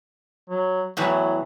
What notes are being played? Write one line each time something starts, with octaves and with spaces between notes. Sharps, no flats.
F#3
E2 A2 E3 F#3